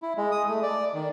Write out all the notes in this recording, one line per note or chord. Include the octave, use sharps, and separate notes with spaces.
E4
G#3
D#6
A3
D5
D#3